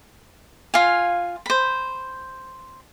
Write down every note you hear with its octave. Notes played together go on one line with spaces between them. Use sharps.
F4 F5 G#5
C5 B5